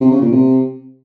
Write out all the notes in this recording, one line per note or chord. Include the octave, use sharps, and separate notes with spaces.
C3
C#3
A#2
C3